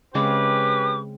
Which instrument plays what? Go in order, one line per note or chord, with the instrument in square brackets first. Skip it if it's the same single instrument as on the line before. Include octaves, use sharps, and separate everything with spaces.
[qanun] C#3 G#3 C4 [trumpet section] C#4 G4 B4 [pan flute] D6